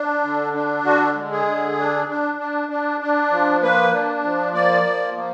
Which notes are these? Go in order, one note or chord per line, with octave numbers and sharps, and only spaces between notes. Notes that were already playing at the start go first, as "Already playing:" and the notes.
Already playing: D4
D3
D4
D3 F#4
G#3
G#4
D3
D4
D4
D4
D4
D4
F3
A#3 B4
D4
F3
A#3 D5
F3
A#3